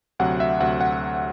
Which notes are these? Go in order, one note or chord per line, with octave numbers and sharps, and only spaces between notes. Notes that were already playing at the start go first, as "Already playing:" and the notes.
D2 C3 F#3 F#5
E5
D2 C3 F#3 F#5
F#5